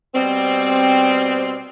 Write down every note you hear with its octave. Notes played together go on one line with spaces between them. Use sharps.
B2 G3 C4